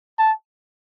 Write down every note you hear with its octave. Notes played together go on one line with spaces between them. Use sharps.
A5